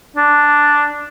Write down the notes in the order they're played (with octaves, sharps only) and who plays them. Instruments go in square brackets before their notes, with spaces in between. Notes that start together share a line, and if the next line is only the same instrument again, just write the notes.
[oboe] D4